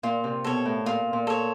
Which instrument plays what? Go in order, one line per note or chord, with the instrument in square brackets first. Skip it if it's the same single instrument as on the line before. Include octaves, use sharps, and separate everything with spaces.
[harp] A#2 [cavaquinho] F4
[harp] C3
[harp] B2 [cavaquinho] A4 C#5
[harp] A2
[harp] A#2 [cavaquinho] F4
[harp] A#2
[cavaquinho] A4 C#5